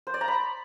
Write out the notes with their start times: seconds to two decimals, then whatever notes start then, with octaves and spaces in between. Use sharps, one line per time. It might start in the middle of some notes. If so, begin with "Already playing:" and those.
0.07 C5
0.14 D5
0.21 A#5
0.28 B5